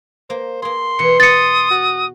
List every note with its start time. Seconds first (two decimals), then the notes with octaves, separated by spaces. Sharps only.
0.30 A#3 C5
0.62 A#3 G#4 C6
0.99 E2 B2 E3 C#7
1.20 D#6 A6 C#7
1.71 F#4